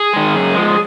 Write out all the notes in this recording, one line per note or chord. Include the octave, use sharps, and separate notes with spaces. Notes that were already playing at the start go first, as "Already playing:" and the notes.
Already playing: G#4
D#3 G#3
F#2
F3 G#3